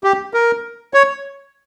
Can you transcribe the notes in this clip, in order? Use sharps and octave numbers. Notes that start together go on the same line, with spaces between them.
G4
A#4
C#5